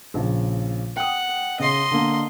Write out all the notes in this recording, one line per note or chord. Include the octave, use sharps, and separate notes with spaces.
A#1 C#3
F#5 G5 D#6
C#3 D#5 C6
D3 A#3